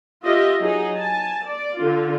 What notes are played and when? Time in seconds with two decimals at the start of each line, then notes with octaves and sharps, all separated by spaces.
0.23 F4 G4 D#5 E5
0.60 F#3 D#4 G#4
0.96 G#5 A5
1.46 D5
1.75 D3 F4